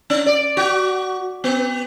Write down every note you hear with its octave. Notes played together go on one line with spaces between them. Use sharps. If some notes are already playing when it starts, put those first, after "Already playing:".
C#4
D5
F#4
B3